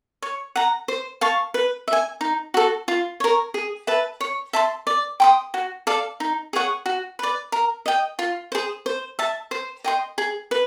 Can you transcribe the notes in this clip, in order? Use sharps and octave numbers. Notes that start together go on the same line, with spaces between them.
C#5
F#5 A#5
C5
F5 A5 C#6
B4
E5
G#5
D#4
F#4 A4
F4
A#4 C#5
G#4
B4 E5 A5
C#5
E5 A5 C6
D5
G5 C6 D#6
F#4
A4 D5 F5
D#4
G#4 C#5 F#5
F#4
B4 D5
A#4
D#5 G5
F4
G#4 C5
C5
E5 A5
C5
D#5 G5 C6
G#4
B4